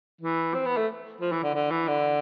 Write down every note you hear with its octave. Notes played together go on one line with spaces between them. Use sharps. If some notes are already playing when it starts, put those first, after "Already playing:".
E3
C4
B3
A3
F3
E3
D3
D3
E3
D3